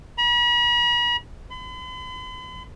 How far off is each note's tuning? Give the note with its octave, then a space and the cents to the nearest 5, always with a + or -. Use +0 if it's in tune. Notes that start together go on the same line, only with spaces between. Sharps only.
B5 -45
B5 +45